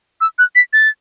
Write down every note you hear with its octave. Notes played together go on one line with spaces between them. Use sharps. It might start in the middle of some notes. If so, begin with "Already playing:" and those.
E6
F#6
B6
A6